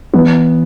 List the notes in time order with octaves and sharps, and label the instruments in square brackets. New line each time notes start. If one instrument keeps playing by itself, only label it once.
[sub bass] E3 [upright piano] B3